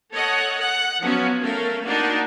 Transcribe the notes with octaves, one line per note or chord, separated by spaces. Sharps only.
A4 C#5 D#5 F#5
F#5
F3 F#3 B3 C#4 F#4
A3 C#4 A#4 F5
A#3 D4 D#4 F#4